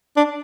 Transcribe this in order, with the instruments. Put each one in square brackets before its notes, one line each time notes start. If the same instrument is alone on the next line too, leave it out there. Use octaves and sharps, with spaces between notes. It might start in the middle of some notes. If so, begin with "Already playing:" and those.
[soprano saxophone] D4